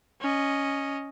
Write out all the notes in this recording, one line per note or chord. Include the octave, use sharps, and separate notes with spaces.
C#4 D#5